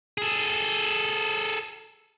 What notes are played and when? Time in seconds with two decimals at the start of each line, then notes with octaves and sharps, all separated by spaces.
0.18 G#4 A4